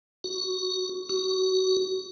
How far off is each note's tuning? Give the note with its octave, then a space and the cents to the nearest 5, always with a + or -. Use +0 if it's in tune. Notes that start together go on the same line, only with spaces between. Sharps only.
F#4 +5
F#4 +25